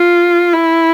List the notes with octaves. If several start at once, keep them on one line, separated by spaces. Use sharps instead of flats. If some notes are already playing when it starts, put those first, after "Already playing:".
Already playing: F4
E4